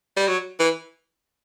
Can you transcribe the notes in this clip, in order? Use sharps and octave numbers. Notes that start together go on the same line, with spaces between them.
G3
F#3
E3